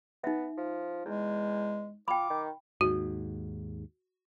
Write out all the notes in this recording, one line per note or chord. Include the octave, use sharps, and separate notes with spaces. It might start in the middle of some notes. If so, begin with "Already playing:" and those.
B3 D#4 E5
F3
E2 G#3
F4 G5 B5 D6
D#3
D#2 G#2 F#4